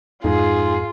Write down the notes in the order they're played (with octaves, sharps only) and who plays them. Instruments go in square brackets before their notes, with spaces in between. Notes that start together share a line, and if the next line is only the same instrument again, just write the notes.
[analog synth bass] F2 [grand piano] G#2 [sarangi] F4 [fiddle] G#4